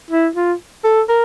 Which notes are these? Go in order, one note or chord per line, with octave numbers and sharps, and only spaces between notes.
E4
F4
A4
A#4